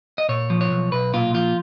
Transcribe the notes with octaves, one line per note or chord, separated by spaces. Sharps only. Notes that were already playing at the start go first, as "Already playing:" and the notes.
D#5
A#2 C#5
F3
C#5
B1
B1 B4
A#2 F4
F3 F4